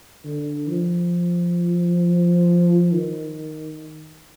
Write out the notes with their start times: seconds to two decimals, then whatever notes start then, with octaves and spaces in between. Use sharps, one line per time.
0.25 D3
0.69 F3
2.92 D#3